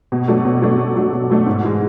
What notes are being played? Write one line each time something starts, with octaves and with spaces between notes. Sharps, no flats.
B2
F#3 A3 D4
B2
F#3 A3 D4
B2
F#3 A3 D4
B2
F#3 A3 D4
G#2
E3 G#3